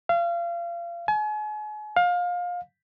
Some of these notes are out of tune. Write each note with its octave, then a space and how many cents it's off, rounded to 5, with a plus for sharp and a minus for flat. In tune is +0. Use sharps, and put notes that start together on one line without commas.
F5 -30
G#5 +40
F5 +25